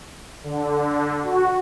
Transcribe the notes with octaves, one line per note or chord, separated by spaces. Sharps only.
D3
F#4